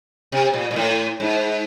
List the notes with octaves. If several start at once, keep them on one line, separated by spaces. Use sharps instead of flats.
C3
A#2
A#2
A2
G#2